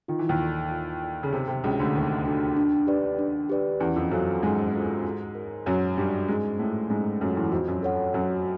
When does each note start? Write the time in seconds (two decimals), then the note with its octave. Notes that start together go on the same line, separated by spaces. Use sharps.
0.08 D#3 F4
0.19 E3
0.29 D#2 D#3
0.40 A4 D5
0.71 F4
1.02 A4 D5
1.23 C#3
1.33 C3 B3
1.48 C3
1.63 C#2 C#3 D4 F#4 A4
1.79 D2 D3
1.94 D#2 D#3 B3
2.25 D4 F#4 A4
2.57 D4
2.87 G4 B4 D5
3.19 D4
3.49 G4 B4 D5
3.80 E2 E3 C#4
3.96 F2 F3
4.11 F#2 F#3 F4 A4 C5 F5
4.42 G#2 G#3 C#4
4.73 F4 A4 C5 F5
5.04 F#4
5.35 A#4 C#5
5.66 F#2 F#3 F#4
5.97 G2 G3 A#4 C#5
6.28 G#2 G#3 C#4
6.59 A2 A3 F4 A4
6.90 G#2 G#3 C#4
7.21 F#2 F#3 F4 A4
7.36 E2 E3
7.47 E3
7.52 F2 F3 F#4
7.68 F#2 F#3
7.83 A4 C#5 F#5
8.14 F#2 F#3 F#4